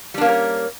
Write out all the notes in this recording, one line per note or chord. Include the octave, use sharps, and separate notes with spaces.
G3 A#3 C#4 D4 A#4